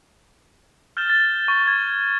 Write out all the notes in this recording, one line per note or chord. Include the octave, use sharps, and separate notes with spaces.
F6 G6 A6 E7 G7
A6
C#6
G#6